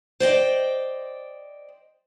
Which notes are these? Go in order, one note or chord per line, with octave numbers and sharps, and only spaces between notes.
C5 D5 D#5 G5